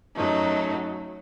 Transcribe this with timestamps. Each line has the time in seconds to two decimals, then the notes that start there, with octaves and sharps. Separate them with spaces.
0.16 F#2 F#3 A3 D#4